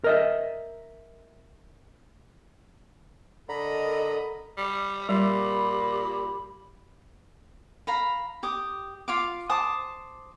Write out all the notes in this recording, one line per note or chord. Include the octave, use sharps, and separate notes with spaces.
A#4 D#5 E5
D3 A4 A#4 D#5 A#5 B5
G3
A#2 G3 G4 B5
F5 A#5 B5
G4 D6 D#6
F4 F5 D6
C5 A5 D6 D#6